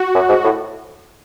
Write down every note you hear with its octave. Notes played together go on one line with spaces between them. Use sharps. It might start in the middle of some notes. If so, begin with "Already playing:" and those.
Already playing: F#4
F#2
G#2
A2